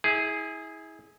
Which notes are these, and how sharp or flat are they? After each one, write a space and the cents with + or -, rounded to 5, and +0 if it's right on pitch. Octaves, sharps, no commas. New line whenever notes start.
E4 -30 G#4 +0